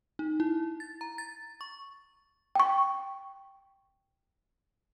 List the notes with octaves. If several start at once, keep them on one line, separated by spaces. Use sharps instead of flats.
D#4
E4
A6
A#5
A6
C#6
G5 C#6